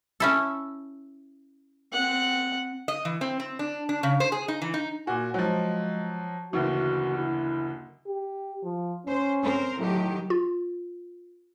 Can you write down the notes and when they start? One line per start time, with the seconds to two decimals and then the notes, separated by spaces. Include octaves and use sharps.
0.20 C#4 E4 A4
1.93 C4 F#5
2.88 D#5
3.05 E3
3.21 C4
3.40 C4
3.59 D4
3.89 D4
4.03 C#3
4.20 C5
4.32 G#4
4.48 D#4
4.62 E3
4.74 D#4
5.07 A#2 F#4 G#5
5.34 F3 F#3 G#3
6.53 F#1 D2 E3 F#4
7.17 E4
8.07 G4
8.64 F3
9.06 C#4 C5
9.41 C4 A#4 C5
9.78 A2 D#3 F#3 G4
10.30 F4